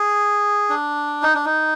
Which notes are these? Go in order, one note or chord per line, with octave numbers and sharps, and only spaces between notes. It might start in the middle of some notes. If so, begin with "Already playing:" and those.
Already playing: G#4
D4
D#4
D4
D#4